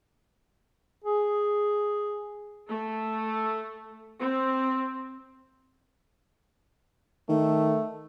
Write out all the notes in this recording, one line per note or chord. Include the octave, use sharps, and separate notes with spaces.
G#4
A3
C4
D#3 A3